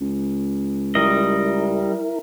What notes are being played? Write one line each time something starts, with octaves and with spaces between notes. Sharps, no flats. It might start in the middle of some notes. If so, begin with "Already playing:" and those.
C#2
G3 E4 A#4 D#5